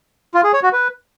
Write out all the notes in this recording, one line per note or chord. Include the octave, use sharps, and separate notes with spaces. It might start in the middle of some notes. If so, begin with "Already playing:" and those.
F4
G#4
C#5
F#4
B4